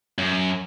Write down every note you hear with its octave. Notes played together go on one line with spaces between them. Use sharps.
F#2